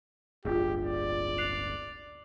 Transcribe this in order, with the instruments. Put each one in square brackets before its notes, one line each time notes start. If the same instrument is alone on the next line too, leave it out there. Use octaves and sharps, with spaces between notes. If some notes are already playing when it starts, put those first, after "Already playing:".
[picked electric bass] D1 G1 [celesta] F4 G#4 [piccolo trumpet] G4
[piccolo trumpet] D5
[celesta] F#6 C7 F7